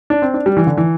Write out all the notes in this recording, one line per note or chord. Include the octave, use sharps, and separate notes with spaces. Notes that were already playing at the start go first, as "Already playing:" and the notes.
D4
C4
D4
G3
E3
D3
E3